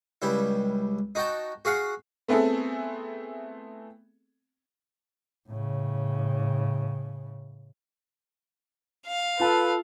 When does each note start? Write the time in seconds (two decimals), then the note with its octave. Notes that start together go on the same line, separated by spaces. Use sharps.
0.22 C#2 G3 E4
1.15 D#4 F#4 G5 A5
1.65 F#4 G#4 F5 F#5
2.28 A3 B3 C4 E4 G#4 A4
5.48 A2 C#3
9.06 F5
9.40 F4 A4 B4 A5